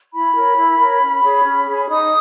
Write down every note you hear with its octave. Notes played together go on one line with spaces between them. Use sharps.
E4 B5
A#4 C#5
E4
A#4 C#5
C#4
G#4 C#5
C#4
G#4 C#5
D#4 D#6